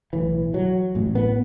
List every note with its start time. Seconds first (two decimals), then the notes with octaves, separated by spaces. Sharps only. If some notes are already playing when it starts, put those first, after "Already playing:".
0.13 B1 A2 E3
0.54 F#3
0.95 A1 A2
1.15 B3